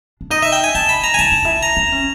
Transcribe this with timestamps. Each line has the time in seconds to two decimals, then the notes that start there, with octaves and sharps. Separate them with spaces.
0.21 D4
0.30 D#4 D#5
0.43 E5
0.52 G5
0.64 G#5
0.75 D4 A5
0.89 B5
1.04 A#5
1.14 G#5
1.19 E4 A5
1.32 D#4
1.45 E4
1.63 A#5
1.77 D4
1.92 C#4